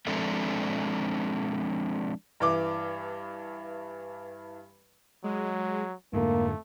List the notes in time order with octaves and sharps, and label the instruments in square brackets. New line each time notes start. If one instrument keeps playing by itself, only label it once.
[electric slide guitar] F3 G#3 C4 D4 A4 E5
[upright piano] G2 E3 D6
[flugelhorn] F#3 [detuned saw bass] G#3
[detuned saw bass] F2 [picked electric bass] G#2 D3 [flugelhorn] A3 [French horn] A#3